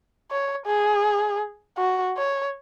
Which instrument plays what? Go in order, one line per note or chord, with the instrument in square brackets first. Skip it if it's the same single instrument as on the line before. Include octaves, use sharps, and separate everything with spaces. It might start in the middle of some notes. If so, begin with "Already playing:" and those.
[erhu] C#5
G#4
F#4
C#5